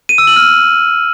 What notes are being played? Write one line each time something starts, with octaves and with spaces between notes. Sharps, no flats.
D#7
E6
F#7
F6